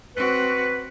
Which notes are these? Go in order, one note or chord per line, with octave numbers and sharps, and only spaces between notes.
C4 F#4 B4